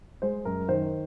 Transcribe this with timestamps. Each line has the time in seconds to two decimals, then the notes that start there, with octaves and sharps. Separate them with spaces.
0.22 G#3 C5
0.45 F#2 A#4
0.69 D#3 C5